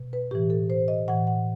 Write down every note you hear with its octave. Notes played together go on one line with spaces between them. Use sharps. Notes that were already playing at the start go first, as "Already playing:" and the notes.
Already playing: B2
B4
A2 E3 G4
A4
C5
D#5
A2 E3 F#5
F#5